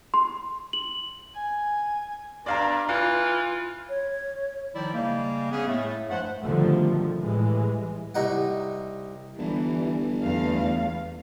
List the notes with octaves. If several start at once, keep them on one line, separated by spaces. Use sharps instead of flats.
C6
F#7
G#5
G2 D4 D5 F5 A#5
E3 F4 F5
C#5
D#3 F3 G3 D#4 E4 D5
C#3 G3 G#3 A#3
B3 C#4 G#4
A2 A3
G2 F3 G#3 A3 C5 F#5
B2 D3 D#3 F3 G3 A3
A2 E3 G3 G#3
C2 D#4 F#5
G1 E3 G3
E2 A3 F5